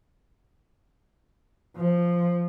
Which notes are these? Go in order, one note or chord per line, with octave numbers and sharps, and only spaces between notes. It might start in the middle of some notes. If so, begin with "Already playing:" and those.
F3